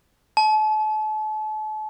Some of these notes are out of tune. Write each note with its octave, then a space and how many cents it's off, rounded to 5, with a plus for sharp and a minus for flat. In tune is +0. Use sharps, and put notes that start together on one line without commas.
A5 -35